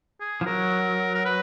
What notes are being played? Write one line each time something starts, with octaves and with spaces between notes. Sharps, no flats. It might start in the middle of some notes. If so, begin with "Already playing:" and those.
G#4
F3
F#3 A#4
A#4
B4